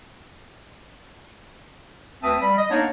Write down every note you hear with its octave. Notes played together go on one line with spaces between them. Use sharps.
D2 C4 B4 E5 A5 D#6
G3 B5
D#5
A#3 B3 D4 D#4 C#5